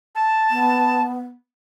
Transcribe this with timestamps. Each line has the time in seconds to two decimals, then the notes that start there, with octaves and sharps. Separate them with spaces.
0.15 A5
0.50 B3